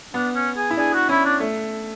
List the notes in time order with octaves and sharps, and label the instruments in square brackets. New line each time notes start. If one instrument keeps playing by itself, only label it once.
[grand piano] B3 [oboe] D4
[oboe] C#4
G#4
[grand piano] E4
[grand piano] D4 [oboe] G#4
[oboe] F#4
[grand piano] C#4 [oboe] E4
[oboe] D4
[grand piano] A3